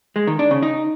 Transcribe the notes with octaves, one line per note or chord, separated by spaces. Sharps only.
G#3
D#3
D4
C#3
D#4